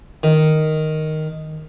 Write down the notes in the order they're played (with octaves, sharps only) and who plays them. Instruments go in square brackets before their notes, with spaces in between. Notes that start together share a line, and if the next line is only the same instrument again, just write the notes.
[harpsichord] D#3